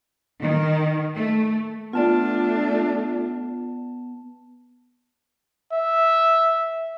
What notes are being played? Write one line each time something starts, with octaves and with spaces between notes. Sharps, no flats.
D#3
A3
A3 B3 D4 F4 D5 A5
E5